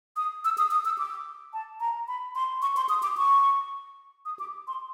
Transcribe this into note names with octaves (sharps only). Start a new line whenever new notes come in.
D#6
E6
D#6
D#6
E6
D6
A5
A#5
B5
C6
C#6
C6
D#6
D6
C#6
D#6
D6
C6